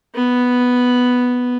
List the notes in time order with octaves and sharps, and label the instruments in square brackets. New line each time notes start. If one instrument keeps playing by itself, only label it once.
[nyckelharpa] B3